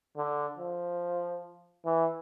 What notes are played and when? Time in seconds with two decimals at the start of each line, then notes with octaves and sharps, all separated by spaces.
0.17 D3
0.58 F3
1.85 E3